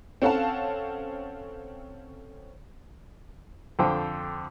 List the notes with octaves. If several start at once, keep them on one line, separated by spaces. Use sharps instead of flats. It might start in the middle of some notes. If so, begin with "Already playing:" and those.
C4 C#4 A4 F5 F#5 A5
F2 D3 C5 G5